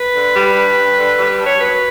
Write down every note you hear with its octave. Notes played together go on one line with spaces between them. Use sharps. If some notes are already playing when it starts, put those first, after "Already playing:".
Already playing: B4
D3
G3
G2
G2
D3
G3
G2
C#5
F#2 B4